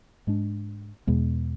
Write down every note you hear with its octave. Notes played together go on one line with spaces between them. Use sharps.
G#2 G#3 D4
E2 B2 G#3 B3